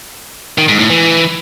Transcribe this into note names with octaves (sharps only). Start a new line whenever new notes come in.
D#3
G#2
A2
E3